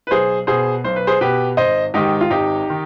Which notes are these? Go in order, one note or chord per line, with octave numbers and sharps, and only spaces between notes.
B4
B1 G#4 C5
B2 G#4 C5
B1 C5
B4
G#4 C5
B2 G4 B4
G#1 C5 D#5
G#2 D#3 D#4 G4
F4
G#1 D#4 G4
D#3